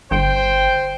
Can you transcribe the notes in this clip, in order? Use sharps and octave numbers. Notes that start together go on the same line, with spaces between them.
G1 C5 G5